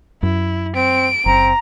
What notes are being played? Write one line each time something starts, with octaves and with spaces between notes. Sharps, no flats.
F#2 E4
C4 D7
F#1 C4 A#5